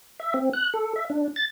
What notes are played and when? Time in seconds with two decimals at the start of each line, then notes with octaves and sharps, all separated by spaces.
0.20 E5
0.34 C4
0.53 F#6
0.74 A4
0.96 E5
1.10 D4
1.36 A6